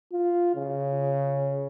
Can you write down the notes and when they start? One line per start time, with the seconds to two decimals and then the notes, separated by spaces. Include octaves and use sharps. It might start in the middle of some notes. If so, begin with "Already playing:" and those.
0.12 F4
0.55 C#3